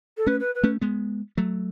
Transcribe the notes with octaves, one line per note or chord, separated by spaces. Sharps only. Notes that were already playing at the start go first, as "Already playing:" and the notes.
A4
A3 C#4 B4
B4
B4
A3 C#4
G#3 B3
F#3 A3